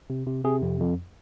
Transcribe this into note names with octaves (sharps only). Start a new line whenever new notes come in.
C3
C3
C3 G#4
F2
F2